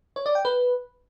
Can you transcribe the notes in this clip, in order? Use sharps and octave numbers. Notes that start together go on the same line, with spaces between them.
C#5
D5
G5
B4